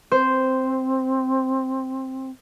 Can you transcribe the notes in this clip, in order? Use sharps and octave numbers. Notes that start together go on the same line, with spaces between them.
C4 C5